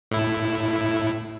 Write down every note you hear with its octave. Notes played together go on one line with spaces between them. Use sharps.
A2 E4